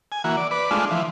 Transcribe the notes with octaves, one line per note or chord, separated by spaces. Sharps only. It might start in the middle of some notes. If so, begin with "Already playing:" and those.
G#5
E3 A#3 F#4
D5
B4 D5
G#3 A3 D4 F4
E3 F3